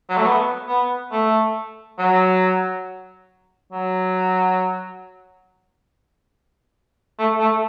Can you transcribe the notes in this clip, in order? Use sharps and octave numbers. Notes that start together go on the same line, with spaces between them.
F#3
A3
B3
B3
A3
F#3
F#3
A3
A3